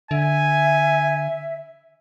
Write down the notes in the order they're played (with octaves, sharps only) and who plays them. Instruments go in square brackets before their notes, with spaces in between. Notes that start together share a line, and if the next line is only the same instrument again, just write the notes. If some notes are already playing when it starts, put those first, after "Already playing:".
[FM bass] D3 [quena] E5 [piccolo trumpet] G#5